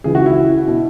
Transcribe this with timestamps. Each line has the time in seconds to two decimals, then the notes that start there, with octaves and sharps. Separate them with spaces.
0.04 C#2 C#3 E3 G#4
0.15 F#4
0.26 E4
0.67 B2 E4